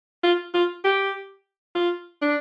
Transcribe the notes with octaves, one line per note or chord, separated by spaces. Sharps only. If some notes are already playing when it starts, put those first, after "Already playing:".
F4
F4
G4
F4
D4